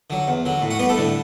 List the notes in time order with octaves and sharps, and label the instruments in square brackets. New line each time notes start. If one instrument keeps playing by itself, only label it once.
[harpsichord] D3 F#3
E2
D3 F#3
A2
F#4 F#5
G3 B3 B4
A3 A4
A2 D3 D4